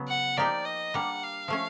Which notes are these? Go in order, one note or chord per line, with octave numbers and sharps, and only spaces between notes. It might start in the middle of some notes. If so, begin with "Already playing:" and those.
Already playing: C#3 F#3 B3
F#5
F3 A#3 D#4 G4 D5
D#5
G3 A#3 D4 F#5
F5
F3 A3 C#4